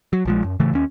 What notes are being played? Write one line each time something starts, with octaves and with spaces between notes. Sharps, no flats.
F#3
A#1 F3 G#3
F#2
A2 C#3 E3 A3
D#2 C#4